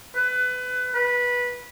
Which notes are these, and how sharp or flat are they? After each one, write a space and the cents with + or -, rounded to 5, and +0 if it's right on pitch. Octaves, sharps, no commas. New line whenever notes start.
B4 +25
B4 -15